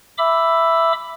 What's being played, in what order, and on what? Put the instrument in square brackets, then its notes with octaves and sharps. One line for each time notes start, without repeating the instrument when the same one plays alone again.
[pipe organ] E5 B5 D6 E6